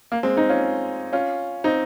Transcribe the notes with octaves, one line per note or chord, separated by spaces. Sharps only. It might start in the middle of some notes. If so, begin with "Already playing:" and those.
A#3
G#3 C4
C4 D#4
C#4 F4
C#4 F4
C4 D#4